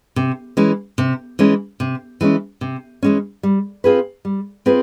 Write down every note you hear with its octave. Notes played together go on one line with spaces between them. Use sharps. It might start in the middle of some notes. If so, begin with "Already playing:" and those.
C3
E3 G#3 C#4
C3
E3 G#3 C#4
C3
E3 G#3 C#4
C3
E3 G#3 C#4
G3
C4 F4 G#4 B4
G3
C4 F4 G#4 B4